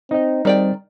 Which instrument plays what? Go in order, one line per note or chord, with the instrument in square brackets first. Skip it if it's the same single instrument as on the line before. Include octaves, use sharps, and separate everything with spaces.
[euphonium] C4 [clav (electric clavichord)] D#4 D#5
[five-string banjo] D#3 D5 G5 [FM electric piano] G3 G#4 [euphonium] C4